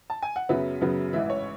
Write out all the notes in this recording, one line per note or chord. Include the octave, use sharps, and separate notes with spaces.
A5
G#5
F#5
F#2 C#3 F#3 B3 E5
F#2 C#3 F#3 B3
A1 G#2 E3 E5
C#5